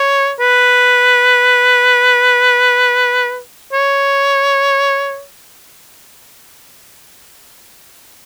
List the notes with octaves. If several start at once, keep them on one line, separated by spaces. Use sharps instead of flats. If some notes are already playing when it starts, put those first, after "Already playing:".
Already playing: C#5
B4
C#5